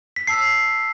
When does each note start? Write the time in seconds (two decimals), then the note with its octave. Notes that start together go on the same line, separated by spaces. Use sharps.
0.16 B6
0.27 A5 E6 C7